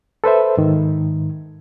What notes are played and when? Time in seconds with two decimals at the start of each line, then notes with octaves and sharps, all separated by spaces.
0.24 A4 B4 C5 E5
0.57 G#2 D#3